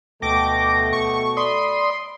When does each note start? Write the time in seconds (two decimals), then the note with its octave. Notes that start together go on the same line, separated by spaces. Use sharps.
0.22 D2 B2 A3 G5 D6 A#6
0.93 C#6
1.37 D5 B5 C6 D#6